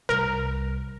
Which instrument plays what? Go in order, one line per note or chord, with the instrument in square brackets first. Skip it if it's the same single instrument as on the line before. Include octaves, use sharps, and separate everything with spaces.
[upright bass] C2 [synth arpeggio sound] A#4